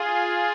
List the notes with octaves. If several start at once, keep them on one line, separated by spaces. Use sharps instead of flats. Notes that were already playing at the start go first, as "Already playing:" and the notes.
Already playing: F4 G#4